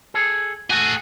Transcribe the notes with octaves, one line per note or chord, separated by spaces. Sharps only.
G#4 A4
A3 F#4 G#4 A4